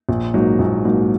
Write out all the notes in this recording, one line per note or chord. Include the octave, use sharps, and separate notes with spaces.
A#1
G#2 F#3 A#3 D#4
A#1
G#2 F#3 A#3 D#4